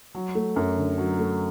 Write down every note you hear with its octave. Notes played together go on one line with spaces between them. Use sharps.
F#3
A3
F#2
D3
F#3
A3